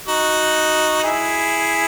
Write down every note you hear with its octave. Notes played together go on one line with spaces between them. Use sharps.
D#4 F#4
E4 G#4